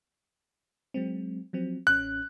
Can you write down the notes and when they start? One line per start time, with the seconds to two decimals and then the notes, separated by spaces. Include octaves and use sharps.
0.94 F#3 G#3 C4
1.53 F3 F#3 C4
1.87 A1 C#4 F#6